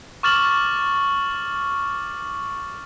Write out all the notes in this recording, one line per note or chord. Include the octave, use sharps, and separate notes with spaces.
C#6 D6 F6 A6 E7 F#7